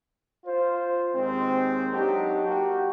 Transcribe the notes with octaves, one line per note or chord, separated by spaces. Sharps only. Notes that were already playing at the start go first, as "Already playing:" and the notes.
F4 C5
D#2 D#3 G#3 C4
F#3 D4 D#4 F#4 G4
A#3 F#4 G4